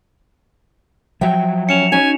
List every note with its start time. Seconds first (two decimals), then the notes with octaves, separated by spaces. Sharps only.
1.21 F3 F#3 E5 G5
1.69 C#4 C#7 E7 F7
1.92 C#4 D#4 F#4 G#5